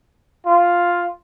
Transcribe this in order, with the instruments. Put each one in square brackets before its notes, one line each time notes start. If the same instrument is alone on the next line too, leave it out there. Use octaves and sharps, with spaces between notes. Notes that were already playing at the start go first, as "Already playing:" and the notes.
[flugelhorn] F4